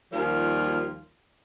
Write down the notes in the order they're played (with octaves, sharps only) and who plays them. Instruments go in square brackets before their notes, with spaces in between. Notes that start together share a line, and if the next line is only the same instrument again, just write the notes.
[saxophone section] D#2 F3 G3 A#3 F4